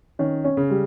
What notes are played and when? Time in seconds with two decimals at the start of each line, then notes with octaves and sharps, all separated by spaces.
0.19 D#3 C#4
0.44 C#4
0.57 C#3
0.70 G3